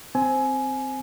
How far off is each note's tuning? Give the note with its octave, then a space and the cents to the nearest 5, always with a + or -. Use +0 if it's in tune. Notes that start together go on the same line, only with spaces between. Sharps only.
C4 +0 G#5 +20